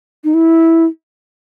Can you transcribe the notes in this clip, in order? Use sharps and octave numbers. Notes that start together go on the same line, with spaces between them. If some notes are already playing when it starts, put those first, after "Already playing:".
D#4
E4